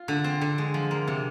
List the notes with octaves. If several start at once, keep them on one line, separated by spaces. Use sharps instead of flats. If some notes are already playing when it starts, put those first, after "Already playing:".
Already playing: F4
D3
C4
D3
G#3
F3
A#3
C3